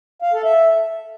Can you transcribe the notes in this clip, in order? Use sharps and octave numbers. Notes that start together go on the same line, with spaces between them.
F5
A4
E5